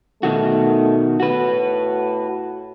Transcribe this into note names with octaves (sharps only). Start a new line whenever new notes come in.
B2 D#3 A3 F#4
A2 F#4 B4